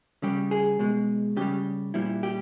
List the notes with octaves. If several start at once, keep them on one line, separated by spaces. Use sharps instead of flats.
C#3 G3 G4
G#4
B2 G#3
C#3 G3 G4
A#2 G3 E4
G4